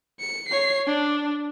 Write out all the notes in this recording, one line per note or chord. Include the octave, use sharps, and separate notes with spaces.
C#7
C#5 C7
D4